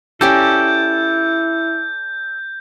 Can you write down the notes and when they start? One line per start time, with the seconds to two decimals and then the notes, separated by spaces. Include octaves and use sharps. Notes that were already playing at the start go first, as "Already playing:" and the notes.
0.21 C#4 E4 G4 A4 D5 A#5 G6